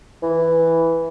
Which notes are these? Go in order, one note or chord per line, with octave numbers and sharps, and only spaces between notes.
E3